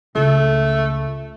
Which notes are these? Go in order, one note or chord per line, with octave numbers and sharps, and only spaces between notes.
C#2 A3